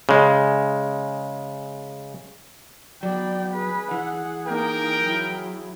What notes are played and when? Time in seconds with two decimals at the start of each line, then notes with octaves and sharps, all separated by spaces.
0.09 C#3 G#3
3.03 F#3 B3 D5 G5
3.54 G#4 B4
3.91 E3 F#5
4.46 A#3 D#4 A#4 G5
5.01 F#3 E4